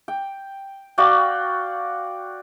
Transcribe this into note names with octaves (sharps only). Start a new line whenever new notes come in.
G5
F#4 D5 F5 G5